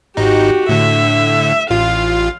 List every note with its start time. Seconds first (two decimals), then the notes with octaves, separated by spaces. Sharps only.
0.17 G#1 D#4 F#4 G4
0.69 A2 D3 E5
1.70 A1 F4 F5